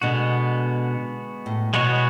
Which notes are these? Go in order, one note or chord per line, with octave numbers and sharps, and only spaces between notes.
B2 D3 G#3 B3 F#4
A2
B2 G#3 B3 F#4 C#5